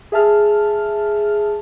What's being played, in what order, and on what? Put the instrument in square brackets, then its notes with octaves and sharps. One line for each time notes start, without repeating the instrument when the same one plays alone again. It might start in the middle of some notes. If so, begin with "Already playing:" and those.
[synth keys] G#4 E5 A5 F6